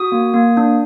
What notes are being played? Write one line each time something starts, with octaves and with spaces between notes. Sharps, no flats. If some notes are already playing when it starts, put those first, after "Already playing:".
Already playing: F#4 D#6
A#3
A#3
D4